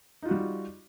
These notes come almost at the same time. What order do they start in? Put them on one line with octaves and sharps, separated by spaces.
D#4 F4 F#4 G3